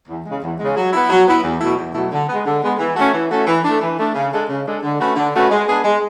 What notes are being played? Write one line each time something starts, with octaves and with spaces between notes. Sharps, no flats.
E2
C#3 G#3
E2
C#3 G#3
F#3
B3 E4
F#3
B3 E4
E2
B2 F#3 A3 E4
E2
B2 F#3 A3 E4
D3
G#3 B3
D3
G#3 B3
E3
A3 C#4 F#4 A4
E3
A3 C#4 F#4 A4
E3
A3 D4
E3
A3 D4
C#3
G#3 D4 A4
C#3
G#3 D4 A4
D3
A3 C#4 F#4 B4
D3
A3 C#4 F#4 B4
G#3
B3 D4 G#4
G#3